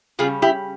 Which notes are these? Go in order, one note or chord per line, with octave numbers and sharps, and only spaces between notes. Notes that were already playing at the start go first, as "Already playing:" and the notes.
C#3 G3 C#4 F4 G#4
E4 G4